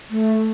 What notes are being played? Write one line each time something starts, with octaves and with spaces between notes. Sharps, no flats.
A3